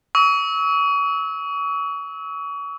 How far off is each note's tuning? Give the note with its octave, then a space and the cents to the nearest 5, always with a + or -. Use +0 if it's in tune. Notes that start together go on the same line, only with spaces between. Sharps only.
C#6 +35 E6 -35